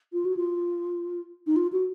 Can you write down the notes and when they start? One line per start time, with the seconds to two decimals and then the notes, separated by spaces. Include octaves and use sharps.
0.13 F4
0.25 F#4
0.36 F4
1.46 D#4
1.56 F4
1.72 F#4